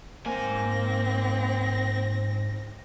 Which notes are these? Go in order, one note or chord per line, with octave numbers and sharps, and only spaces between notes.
G#2 A#3 C4 G#5 A#6